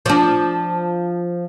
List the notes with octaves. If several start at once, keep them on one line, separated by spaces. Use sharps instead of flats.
F3 D4